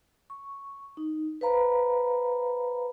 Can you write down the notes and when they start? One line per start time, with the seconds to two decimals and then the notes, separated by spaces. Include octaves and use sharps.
0.30 C#6
0.97 D#4
1.41 B4 C5 F5 A#5 B5